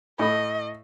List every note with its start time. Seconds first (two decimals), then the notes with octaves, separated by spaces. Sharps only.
0.19 A2 A4 D#5 B5